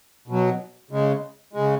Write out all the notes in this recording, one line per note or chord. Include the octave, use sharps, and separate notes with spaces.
B2 F#3
C#3 G#3
C#3 G#3